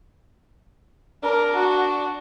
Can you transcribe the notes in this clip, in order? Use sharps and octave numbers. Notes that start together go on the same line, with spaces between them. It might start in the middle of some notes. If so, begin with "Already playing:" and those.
D4 A#4
F#4